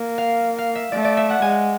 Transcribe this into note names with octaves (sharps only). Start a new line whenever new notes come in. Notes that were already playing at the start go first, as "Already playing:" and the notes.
Already playing: A#3
F5
F5
E5
A3 D5
D5
E5
F#5
G#3 G#5